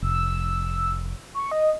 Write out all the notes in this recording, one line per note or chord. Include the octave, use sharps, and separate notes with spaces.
F1 E6
C#6
D#5